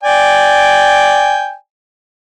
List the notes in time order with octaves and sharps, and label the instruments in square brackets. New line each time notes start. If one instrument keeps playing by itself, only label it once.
[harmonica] D5 G5 G#5